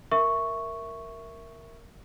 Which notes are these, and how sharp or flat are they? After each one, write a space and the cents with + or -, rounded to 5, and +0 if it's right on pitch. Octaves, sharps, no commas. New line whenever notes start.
A#4 -5 E5 +0 C#6 +0